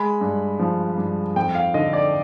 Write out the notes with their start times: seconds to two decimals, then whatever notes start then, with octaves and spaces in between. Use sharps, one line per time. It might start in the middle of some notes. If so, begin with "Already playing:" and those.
Already playing: G#3 B5
0.21 G2
0.59 F3
0.98 G2
1.36 F2 G5
1.55 F5
1.74 D3 D#5
1.93 D5